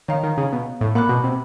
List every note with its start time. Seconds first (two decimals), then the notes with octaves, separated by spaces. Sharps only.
0.08 D#3 C#5 F5 A#5
0.23 D#3
0.37 C#3
0.52 B2
0.81 A2
0.95 A#2 F#5 B5 D6 F#6
1.09 B2
1.24 C3